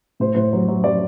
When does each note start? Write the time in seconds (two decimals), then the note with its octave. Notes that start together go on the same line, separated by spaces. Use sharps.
0.20 A2 C5
0.35 A2 C5
0.53 F#3
0.68 F#3
0.84 F#3 D5